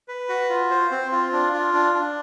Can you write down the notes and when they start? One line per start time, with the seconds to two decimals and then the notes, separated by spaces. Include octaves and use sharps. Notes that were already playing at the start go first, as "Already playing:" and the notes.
0.08 B4
0.29 F#4
0.50 F4
0.70 C5
0.91 C4
1.12 F4
1.33 D4
1.54 F4
1.74 D4
1.94 D4